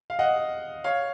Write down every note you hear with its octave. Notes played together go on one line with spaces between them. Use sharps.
F5
D#5 F#5
C#5 F5